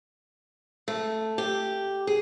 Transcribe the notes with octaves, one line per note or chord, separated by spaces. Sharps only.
A3
G4
G#4